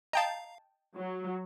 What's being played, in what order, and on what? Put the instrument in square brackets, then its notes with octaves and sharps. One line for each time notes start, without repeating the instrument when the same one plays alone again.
[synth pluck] D#5 G5 A5 [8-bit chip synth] F5 A#5
[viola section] F#3